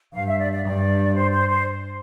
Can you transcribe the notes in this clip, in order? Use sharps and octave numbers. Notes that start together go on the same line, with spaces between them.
G2 F5
E5
D5
D5
G2 D5
C5
C5
C5